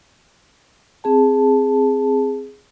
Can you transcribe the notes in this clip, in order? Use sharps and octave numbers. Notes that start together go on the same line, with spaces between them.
C4 G#4 A5